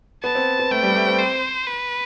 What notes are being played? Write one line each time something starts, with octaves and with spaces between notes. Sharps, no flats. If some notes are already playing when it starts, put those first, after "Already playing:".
B3 A5
C4
B3
A3 G5
G3
A3
C4
C5
B4